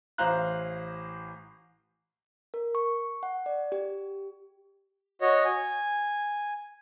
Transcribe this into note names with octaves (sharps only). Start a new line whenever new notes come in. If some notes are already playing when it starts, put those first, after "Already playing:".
A1 C5 F5 A#5 F#6
A#4
C#6
F#5
D5
G4
F#4 C#5 D#5
G#5